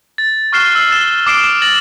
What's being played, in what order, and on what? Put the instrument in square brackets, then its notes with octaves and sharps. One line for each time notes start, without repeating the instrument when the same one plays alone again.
[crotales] A6
C#6 F6 F#6 C7 E7 G7
E6 C7
E6 A6 E7 G7
D6 D#6 C7 D7 E7
A6 A#6 F#7